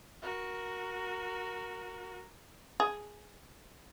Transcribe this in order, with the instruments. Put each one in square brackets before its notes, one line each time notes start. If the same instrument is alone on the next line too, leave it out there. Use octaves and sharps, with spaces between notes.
[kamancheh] F#4 A#4
[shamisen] G#4